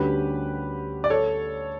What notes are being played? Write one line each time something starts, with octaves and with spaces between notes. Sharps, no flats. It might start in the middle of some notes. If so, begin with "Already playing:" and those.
Already playing: D2 D3 G3 C#4 F#4 G4 B4
D5
A4 C#5